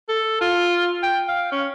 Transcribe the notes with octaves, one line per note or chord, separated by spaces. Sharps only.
A4
F4
G5
F5
C#4